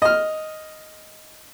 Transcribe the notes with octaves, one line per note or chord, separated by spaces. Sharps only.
D#5 F6